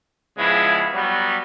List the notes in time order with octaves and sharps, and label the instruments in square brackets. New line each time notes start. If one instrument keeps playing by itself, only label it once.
[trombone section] C#3 F3 G#3 B3 E4
F#3 G3 B3